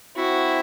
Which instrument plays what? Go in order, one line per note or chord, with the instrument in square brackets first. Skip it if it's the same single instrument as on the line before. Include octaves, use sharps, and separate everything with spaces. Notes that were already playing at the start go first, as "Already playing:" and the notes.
[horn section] C4 E4 [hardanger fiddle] F#4